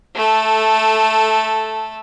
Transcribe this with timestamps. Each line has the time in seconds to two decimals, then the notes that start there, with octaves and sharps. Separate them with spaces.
0.15 A3 A4